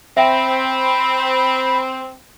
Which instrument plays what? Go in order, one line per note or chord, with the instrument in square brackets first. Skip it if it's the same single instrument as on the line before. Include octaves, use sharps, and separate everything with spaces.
[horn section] C4 [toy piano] E5 G5 [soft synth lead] B5